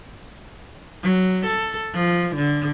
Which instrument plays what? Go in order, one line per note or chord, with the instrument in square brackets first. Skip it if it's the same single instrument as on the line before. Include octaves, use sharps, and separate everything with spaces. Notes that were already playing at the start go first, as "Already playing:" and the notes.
[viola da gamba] F#3
A4
F3
D3